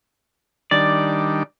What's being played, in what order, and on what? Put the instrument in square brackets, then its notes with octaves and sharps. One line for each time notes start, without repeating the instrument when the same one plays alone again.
[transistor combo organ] D#3 G3 D4 [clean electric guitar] D5